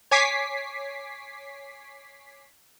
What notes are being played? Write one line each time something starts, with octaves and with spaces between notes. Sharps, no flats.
C#5 G#5 D6 B6 C7